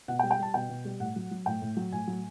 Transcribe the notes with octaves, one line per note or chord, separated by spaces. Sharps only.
B2 F#5
G5
G3
G5
G3 A5
B2 G5
B2
G3
A2 F#5
F#3
F#3
A2 G5
A2
F#3
A2 G#5
F#3